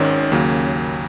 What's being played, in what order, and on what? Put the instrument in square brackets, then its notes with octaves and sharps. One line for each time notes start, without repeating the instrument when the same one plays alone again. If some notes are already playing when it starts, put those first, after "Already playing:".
Already playing: [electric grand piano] G#1 G#2 D#3 [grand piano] C#4
[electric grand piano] D#2 C#3 F#3 A#3